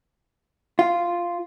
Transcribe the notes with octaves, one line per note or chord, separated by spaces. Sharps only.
F4